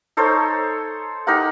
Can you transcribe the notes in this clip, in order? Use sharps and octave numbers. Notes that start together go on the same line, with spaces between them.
D#4 A4 C5 C#5
D#4 G4 A#4 F#5